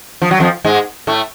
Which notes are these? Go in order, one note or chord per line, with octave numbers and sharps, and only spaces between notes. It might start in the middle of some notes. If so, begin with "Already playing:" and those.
F3
F#3
F2 F3
G#2 G#3
A2 A3